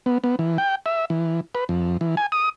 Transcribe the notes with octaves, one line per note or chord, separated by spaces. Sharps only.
B3
B3
E3
G5
E5
E3
B4
F2
E3
G#5
D#6